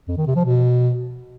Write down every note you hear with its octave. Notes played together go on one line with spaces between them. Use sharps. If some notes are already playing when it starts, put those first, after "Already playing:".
F2
D#3
C3
F3
B2